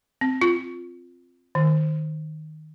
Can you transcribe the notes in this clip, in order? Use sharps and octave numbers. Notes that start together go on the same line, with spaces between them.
C4
F4
D#3